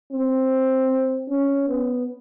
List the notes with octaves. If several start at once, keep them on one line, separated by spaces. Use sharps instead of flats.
C4
C#4
B3